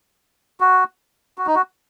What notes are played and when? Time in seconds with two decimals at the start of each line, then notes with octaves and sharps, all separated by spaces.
0.60 F#4
1.38 F#4
1.47 D#4
1.55 F#4